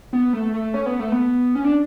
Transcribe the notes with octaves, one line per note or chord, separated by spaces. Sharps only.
B3
A3
A3
C#4
B3
A3
B3
C#4
D4